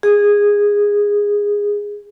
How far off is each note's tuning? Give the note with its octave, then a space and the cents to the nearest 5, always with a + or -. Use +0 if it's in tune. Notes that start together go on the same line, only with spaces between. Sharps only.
G#4 -15